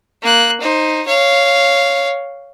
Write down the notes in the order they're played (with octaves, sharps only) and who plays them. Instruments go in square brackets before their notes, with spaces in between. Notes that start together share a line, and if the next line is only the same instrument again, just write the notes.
[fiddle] A#3 F#6
D#4 C5
C#5 F5